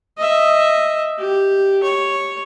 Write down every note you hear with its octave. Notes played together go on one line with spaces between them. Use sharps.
D#5 E5
G4
C#5